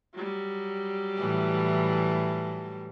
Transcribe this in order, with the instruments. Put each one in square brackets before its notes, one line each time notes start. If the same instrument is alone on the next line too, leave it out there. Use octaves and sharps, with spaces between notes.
[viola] F#3 G3
[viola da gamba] A2 E3